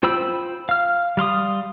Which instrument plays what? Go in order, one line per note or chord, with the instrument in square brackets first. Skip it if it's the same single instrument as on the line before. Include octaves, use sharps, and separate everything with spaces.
[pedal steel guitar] F4 C5 G5 B5 E6
F5 F6
G3 F5 C6 D#6